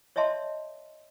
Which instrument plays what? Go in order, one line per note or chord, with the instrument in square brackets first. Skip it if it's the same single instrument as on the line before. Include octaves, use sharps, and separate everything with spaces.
[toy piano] C#5 D#5 E5 A5 C6